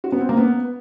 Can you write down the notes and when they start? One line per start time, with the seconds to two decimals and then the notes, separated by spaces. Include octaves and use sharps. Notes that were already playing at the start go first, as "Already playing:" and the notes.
0.04 F#4
0.12 B3
0.21 C4
0.29 A#3
0.37 B3